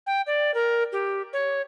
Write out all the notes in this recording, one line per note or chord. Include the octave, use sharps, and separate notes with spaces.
G5
D5
A#4
G4
C#5